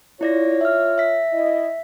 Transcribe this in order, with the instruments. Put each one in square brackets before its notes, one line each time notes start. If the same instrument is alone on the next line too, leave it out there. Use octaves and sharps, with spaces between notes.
[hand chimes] E4 D5 A#6 [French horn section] F4 C#5
[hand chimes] E5 F6
E5 B6
[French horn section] E4 D#5